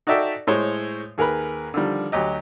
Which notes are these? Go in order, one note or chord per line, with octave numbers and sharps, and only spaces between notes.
D#4 F#4 A4 D5 E5 G5
A2 G#3 C5 C#5
D#2 G#4 A#4 B4 B5
D3 D#3 F3 G3
D2 F#3 G4 D#5